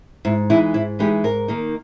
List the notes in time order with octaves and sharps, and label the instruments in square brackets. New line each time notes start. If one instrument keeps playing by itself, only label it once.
[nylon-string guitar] G#2 E4
E3 G#3 D#4 E4
G#2 E4
E3 G#3 D#4 G4
G#2 A#4
D#3 A#3 D#4